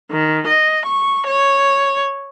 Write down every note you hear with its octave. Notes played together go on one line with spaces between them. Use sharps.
D#3
D#5
C#6
C#5